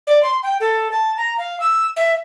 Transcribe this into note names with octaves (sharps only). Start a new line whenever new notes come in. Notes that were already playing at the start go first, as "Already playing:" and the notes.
D5
C6
G5
A4
A5
A#5
F5
E6
E5